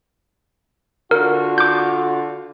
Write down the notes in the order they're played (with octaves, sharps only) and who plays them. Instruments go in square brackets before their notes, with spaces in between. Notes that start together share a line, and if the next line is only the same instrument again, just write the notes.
[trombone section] D3 F4 F#4 [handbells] A#4
[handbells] D6 G6